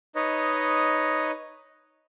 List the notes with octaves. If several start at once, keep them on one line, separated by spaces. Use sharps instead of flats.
D#4 B4 C#5 D#5